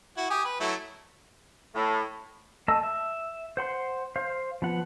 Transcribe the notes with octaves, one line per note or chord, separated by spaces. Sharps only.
E4 F#4
G4 G#5 D#6
B4
F#3 A3 E4
A2
A3 D#5 A5 E6
E5
C5 F#5 C6
C5 F5
F3 B3 F#5